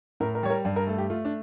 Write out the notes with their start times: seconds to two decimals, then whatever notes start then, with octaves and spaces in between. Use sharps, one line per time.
0.20 A2 A#4
0.35 A#4
0.43 G3 C#5
0.50 A#4
0.65 G2 D5
0.76 A#4
0.87 A3 A4
0.98 G4
1.10 A3 F4
1.25 D4